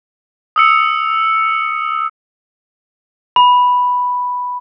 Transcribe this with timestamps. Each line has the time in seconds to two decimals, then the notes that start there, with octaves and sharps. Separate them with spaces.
0.56 D#6 E6 C#7
3.36 B5